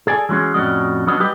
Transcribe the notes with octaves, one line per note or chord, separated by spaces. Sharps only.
G#4 A4 D5 G#5
E3 F#3 G#3 C#4 G#4
F2 A2 C#4 F#4 D5 D#5
F#3 B3 C#4 D4 D#5
F#3 G3 G4 B4 D#5